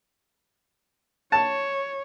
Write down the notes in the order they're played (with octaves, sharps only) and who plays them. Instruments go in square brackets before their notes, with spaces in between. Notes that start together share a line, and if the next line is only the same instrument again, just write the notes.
[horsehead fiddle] C#5 [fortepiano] A5